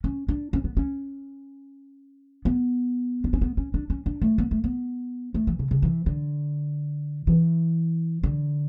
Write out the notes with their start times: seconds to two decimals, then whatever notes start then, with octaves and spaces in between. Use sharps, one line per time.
0.04 C#4
0.28 D4
0.53 C#4
0.64 B3
0.77 C#4
2.45 B3
3.24 D4
3.33 C#4
3.41 B3
3.57 C#4
3.74 D4
3.90 C#4
4.06 D4
4.22 A3
4.38 B3
4.51 A3
4.64 B3
5.34 A3
5.47 E3
5.59 C#3
5.71 C#3
5.82 E3
6.06 D3
7.27 E3
8.24 D3